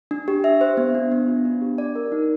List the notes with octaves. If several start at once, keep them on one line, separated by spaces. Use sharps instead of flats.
D4
G4
E5
C5
B3
D4
B3
F4
D4
G4
D5
A#4
D#4